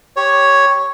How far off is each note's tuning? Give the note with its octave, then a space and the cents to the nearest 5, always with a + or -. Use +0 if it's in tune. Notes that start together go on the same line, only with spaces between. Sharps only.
G4 +0 C#5 +0